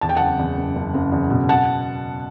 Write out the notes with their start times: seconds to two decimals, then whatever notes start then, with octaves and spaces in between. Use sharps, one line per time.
0.01 E2 A5
0.09 G5
0.17 F#1 F#5 A5
0.39 E2
0.57 F#1
0.76 F#1
0.94 F#1
1.12 E2
1.30 B2
1.49 F#5 A5